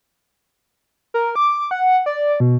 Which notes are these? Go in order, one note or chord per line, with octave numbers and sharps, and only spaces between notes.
A#4
D6
F#5
D5
B2